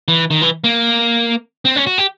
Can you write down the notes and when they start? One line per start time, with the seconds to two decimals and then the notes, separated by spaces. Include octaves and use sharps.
0.08 E3
0.31 D#3
0.42 E3
0.64 A#3
1.65 C4
1.76 C#4
1.87 F#4
1.98 G4